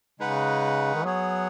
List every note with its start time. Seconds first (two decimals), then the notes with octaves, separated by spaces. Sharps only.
0.20 C#3 G#3 D#4 B4 F#5
0.95 D#3
1.04 F#3 B3 G#4 C#5 F#5